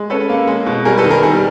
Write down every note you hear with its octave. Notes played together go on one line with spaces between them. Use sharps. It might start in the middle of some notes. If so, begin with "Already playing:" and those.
Already playing: G#3
C#4 A4 B4
A#3
G#3
B2
G3 G#4 A#4
A4 B4
D#3
G#4 A#4
G3 G#4